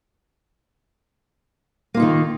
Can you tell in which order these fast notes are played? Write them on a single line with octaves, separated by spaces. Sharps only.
A#3 F4 D#4 D#3